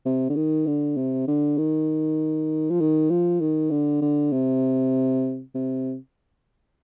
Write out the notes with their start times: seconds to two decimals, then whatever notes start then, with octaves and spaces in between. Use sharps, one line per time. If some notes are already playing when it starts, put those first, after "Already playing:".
0.06 C3
0.29 D3
0.36 D#3
0.67 D3
0.97 C3
1.28 D3
1.58 D#3
2.70 F3
2.80 D#3
3.11 F3
3.41 D#3
3.71 D3
4.02 D3
4.32 C3
5.55 C3